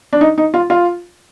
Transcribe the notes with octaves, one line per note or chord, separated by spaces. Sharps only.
D4
D#4
D#4
F4
F4